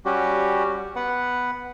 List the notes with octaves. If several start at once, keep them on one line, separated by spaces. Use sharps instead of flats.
G3 C#4 F#4 G4
B3 B4 F#5